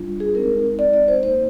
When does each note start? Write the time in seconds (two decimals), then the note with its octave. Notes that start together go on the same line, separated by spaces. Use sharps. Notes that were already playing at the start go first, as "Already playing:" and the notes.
Already playing: G3 D4 F4
0.20 G#4
0.35 G#3 C4 D#4 A#4
0.79 D5
0.93 D5
1.08 C5
1.23 A#3 D#4 C5